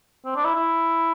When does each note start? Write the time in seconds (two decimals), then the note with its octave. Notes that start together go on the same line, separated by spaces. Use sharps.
0.25 C4
0.35 D4
0.45 E4
0.55 E4